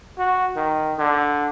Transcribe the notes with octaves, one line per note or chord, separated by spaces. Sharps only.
F#4
D#3
D3